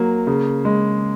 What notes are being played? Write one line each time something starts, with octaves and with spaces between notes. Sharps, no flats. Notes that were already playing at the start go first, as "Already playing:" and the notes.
Already playing: F#3 A#3
C#3
G#3